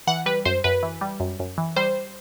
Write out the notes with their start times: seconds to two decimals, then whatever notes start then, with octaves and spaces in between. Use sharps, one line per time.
0.07 E3 F#5
0.26 G3 B4
0.45 F#2 C5
0.64 F#2 B4
0.83 E3
1.01 G3
1.20 F#2
1.40 F#2
1.58 E3
1.76 G3 C5